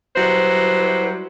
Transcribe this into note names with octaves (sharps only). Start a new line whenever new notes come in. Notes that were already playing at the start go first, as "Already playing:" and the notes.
F#3 G3 E4 B4 C5